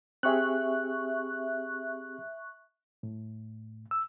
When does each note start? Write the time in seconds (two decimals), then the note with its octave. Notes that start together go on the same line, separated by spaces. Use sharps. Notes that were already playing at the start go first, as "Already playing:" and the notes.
0.23 C4 G4 G#4 E5 C#6 F#6
3.03 A2
3.91 E6